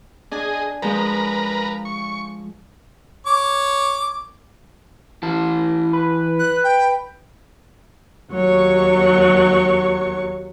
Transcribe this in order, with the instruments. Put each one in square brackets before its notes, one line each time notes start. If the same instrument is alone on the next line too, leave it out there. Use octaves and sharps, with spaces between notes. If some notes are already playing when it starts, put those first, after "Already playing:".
[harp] D4 G#5 [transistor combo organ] G#4 D#5
[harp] F3 G#3 [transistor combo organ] A#4 B4 A#5
[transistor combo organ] C#6
[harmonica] C#5 D6
[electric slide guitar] E3 E4 A5
[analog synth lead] B4
[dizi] F#6
G5
[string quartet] D#2 F#3 C#5 C#6